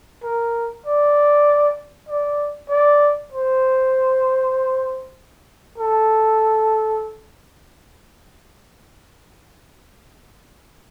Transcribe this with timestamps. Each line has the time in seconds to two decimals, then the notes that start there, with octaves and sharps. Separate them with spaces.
0.23 A#4
0.86 D5
2.09 D5
2.70 D5
3.32 C5
5.78 A4